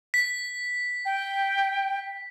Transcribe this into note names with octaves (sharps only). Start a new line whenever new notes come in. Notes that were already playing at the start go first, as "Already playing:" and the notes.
B6
G5